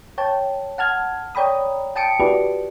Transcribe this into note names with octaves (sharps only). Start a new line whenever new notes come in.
C#5 G5 A5
F#5 A5 F6 G#6
C#5 D5 G5 A#5 B5 D#6
G5 A5 D#6 C#7 D7
E4 F#4 G4 B4 D5